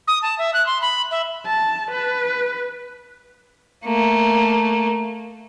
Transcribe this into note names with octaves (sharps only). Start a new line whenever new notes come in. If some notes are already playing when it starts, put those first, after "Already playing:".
D#6
A5
E5
F#6
C6
B5
E5
A5
B4
A3 A#3